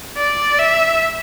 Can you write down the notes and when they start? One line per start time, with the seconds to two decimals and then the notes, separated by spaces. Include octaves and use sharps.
0.17 D5
0.59 E5